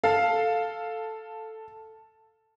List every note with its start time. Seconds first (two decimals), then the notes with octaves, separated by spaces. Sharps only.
0.03 A4 F5